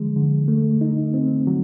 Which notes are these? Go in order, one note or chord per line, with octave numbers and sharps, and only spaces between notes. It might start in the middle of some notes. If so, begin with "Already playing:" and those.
Already playing: D3 F3 G#3
D3
A3
D#4
C4
F#3